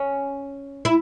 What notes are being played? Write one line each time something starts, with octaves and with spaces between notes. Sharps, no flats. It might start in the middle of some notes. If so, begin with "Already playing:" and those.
Already playing: C#4
E4